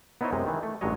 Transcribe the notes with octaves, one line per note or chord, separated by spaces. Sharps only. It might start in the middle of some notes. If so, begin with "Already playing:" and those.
B3 D#4 E4 C5 C#5 D#5
F#2 C3 G#3
D#3 E3
A3
A1 G2 F#3 G#3 C#5 D#5